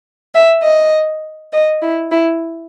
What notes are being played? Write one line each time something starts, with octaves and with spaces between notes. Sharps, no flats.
E5
D#5
D#5
E4
E4